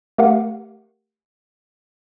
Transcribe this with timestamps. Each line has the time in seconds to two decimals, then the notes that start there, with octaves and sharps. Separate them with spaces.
0.18 A3 G4 A#4 F5 F#5